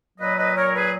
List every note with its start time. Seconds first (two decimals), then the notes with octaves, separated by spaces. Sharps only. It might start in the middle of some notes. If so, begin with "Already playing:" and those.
0.18 A#2 F#3 B4 D#5
0.37 B4 D#5
0.56 A#4 C#5
0.74 G#4 B4